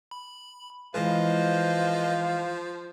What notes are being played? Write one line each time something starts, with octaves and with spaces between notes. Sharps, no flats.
B5
E3 F3 G#3 G#4 B4 C5 D#5 F5